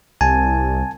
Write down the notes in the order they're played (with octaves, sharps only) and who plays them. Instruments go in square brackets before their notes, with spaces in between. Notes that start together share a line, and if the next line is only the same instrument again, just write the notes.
[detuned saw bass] C2 [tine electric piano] G#5 A5